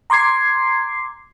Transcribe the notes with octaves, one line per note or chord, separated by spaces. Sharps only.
A#5 C6 D6 G#6 C7